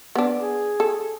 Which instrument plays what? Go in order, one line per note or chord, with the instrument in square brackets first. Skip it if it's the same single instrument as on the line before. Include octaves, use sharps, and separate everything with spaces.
[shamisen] B3 D4
[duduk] G#4
[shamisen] A4